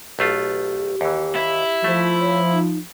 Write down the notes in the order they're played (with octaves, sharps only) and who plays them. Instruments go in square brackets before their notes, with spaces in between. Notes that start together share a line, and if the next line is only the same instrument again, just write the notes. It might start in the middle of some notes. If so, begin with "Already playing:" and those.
[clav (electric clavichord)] B1 A3 F4 [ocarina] G4
[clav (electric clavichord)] D#2 E3
[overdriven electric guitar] E4
[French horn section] F3 [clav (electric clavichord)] A3
[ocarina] C#5
D#4